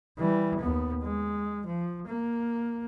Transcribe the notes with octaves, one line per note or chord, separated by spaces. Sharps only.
E3 G3
D#2 B3
G#3
F3
A#3